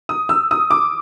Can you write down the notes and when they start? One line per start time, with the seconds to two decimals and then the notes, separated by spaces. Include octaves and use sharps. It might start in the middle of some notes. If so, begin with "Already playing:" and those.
0.09 D#6
0.29 E6
0.51 D#6
0.71 D6